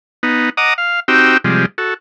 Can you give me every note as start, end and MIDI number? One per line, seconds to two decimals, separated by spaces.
0.23 0.50 59
0.23 0.50 63
0.57 0.74 75
0.57 0.74 78
0.57 0.74 82
0.57 0.74 86
0.57 0.74 87
0.78 1.00 77
1.08 1.37 60
1.08 1.37 63
1.08 1.37 66
1.08 1.37 67
1.08 1.37 79
1.08 1.37 88
1.44 1.66 48
1.44 1.66 53
1.44 1.66 55
1.44 1.66 56
1.78 1.94 66
1.78 1.94 69